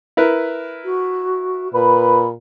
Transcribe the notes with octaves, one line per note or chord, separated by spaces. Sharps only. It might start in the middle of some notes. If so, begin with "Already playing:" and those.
E4 A#4 B4
F#4
A#2 B4 B5